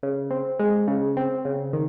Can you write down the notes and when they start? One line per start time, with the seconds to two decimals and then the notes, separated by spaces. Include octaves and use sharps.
0.03 C#3
0.31 C4
0.59 G#3
0.87 C#3
1.17 C4
1.45 C#3
1.73 D#3